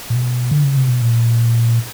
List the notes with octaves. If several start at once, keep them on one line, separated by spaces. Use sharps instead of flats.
A#2
B2
D3
C#3
C3
B2
A#2